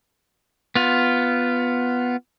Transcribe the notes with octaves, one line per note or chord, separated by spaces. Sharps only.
B3 F4